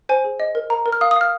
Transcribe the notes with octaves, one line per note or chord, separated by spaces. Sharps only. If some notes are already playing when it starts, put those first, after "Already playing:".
C5 G#5
G#4
D#5
A#4
A#4 A#5
A#4
F6
F5 D#6
D#6
F5 F6